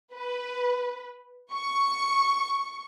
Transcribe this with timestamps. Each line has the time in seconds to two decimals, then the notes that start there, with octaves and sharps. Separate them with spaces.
0.14 B4
1.53 C#6